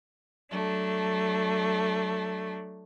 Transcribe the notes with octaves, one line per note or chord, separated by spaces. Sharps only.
F#3 A3 D4